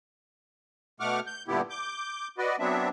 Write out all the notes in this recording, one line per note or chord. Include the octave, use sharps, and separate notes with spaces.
B2 A3 F#5 C#6 D6 F6
G6
G2 A#2 D3 B3 E4 G4
D6 G6
F#4 B4 D5 D#5
F#3 B3 C4 D4 E5